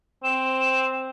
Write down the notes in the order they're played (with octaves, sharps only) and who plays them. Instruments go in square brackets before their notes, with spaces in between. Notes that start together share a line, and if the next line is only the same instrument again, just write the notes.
[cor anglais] C4 [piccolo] E7